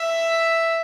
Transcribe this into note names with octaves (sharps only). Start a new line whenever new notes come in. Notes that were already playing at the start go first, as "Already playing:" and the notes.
Already playing: E5